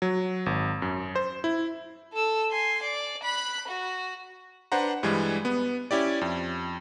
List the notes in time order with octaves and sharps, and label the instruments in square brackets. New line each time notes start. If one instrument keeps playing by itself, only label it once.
[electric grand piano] F#3
G#1
F#2
C5
E4
[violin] A4 E6
G#5 C6
D5
B5 F#6
F#4
[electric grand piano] D4 B4 C5 F#5 A#5
G2 E3 G3 G#3
B3
C#4 E4 G4 D5
F2